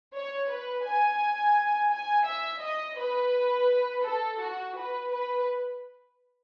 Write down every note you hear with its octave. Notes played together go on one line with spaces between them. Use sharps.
C#5
B4
G#5
G#5
E5
D#5
B4
A4
F#4
B4
B4